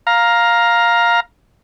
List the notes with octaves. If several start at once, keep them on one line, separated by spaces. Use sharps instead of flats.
F5 A#5